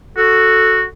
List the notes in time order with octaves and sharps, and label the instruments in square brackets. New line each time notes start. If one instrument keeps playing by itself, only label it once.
[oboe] F#4 [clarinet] A4